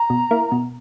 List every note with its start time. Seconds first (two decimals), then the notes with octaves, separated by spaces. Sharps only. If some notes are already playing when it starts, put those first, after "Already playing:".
Already playing: A#5
0.10 B2
0.31 A#3 E4
0.52 B2